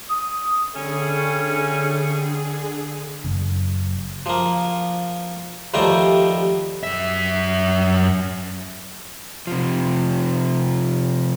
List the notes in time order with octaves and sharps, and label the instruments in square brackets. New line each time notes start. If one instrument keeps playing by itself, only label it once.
[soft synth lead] D#6
[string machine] D3 G#4 [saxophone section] G3 A3 C#4
[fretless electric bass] F#1
[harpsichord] F3 A#3
D#2 F3 G3 A3 G5 A#5
[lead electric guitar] F#2 E5
[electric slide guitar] C3 F3